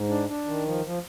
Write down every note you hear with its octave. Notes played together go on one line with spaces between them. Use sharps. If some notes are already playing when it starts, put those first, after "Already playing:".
Already playing: G#2
D4
D4
D#3
F3
F3